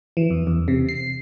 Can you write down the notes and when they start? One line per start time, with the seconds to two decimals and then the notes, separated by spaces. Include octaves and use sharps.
0.17 E3
0.30 E2
0.47 E2
0.68 C3
0.89 C7